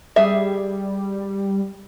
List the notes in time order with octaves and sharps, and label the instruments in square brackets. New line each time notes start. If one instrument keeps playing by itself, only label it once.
[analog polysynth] G3 [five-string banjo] G#4 E5